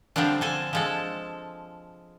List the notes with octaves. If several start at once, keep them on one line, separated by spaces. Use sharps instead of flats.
D3 F3 G3 C4 D4
D3 A4 G#5
F3 G#3 A4